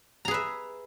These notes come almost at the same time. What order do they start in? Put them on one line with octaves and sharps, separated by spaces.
A#5 G#4 B4 E5